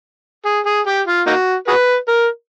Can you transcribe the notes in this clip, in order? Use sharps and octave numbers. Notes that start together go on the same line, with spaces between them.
G#4
G#4
G4
F4
A#3 D#4 F#4
F#4 G#4 B4
A#4